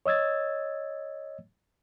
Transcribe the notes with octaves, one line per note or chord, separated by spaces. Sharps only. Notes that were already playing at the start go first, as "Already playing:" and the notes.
C#5 D#5 E6 G#6 A6